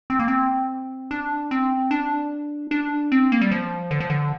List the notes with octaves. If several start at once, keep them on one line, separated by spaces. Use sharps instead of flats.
C4
A#3
C4
D4
C4
D4
D4
C4
A#3
G3
F3
D3
F3
D3